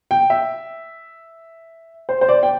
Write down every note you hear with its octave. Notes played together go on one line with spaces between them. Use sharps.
G5
E5
C5
C5
D5
G5